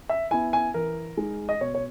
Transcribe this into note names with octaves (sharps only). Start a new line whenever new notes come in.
E5
B3 E4 G#5
G#5
E3 A#4
G#3 D#4
D#5
B2 C#5
C#5